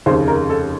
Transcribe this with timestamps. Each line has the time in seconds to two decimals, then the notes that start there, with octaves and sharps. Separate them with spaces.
0.06 F1 D#2 C#3 C5
0.28 A#4
0.50 A4